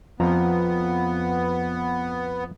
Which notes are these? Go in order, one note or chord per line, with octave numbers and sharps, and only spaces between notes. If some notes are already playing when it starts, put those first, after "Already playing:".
F2 F3 B3 A#5